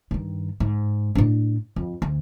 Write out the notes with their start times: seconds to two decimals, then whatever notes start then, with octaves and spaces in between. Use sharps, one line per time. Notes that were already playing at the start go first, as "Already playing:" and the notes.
0.11 G2 D#3
0.60 G#2
1.15 A2 D4
1.76 F2
2.02 D2